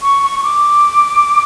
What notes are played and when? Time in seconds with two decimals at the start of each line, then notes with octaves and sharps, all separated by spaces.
0.03 C#6
0.23 C#6
0.39 C#6
0.44 D6